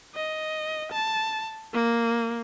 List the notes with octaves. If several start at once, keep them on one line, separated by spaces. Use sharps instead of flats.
D#5
A5
A#3